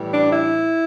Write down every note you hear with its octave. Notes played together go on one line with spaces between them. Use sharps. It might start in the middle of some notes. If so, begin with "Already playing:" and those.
Already playing: A2 E3 G3
D4
E4